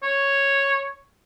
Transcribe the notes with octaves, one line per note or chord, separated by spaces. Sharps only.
C#5